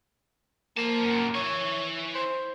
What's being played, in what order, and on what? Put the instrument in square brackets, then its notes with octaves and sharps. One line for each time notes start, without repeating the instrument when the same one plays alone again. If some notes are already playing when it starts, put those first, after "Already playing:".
[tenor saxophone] A#3 [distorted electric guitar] C5 A5
[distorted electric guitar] F#2 A#2
[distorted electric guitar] E4 G#5 [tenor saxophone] C#5
[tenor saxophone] C5